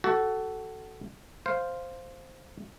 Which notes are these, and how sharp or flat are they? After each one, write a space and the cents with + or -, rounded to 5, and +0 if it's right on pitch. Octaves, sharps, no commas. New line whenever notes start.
F#4 +25 A4 +0
C5 +0 F5 +0